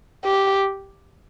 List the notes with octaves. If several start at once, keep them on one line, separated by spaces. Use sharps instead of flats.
G4